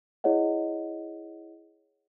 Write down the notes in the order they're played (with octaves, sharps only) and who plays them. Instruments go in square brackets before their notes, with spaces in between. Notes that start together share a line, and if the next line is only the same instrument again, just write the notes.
[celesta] E4 G#4 C#5 D#5 F#5